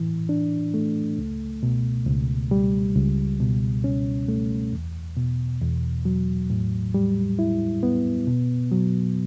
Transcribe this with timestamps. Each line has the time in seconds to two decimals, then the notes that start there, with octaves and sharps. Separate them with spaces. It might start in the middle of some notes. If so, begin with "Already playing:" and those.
Already playing: A2 E3
0.29 D4
0.74 A3
1.18 C#2
1.63 B2
2.07 C#2
2.51 G3
2.95 C#2
3.40 B2
3.84 C#4
4.28 A3
4.73 E2
5.17 B2
5.61 E2
6.05 F#3
6.50 A2
6.94 G3
7.39 E4
7.83 B3
8.27 B2
8.72 F#3